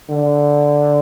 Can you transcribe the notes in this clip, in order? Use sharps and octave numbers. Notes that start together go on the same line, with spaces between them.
D3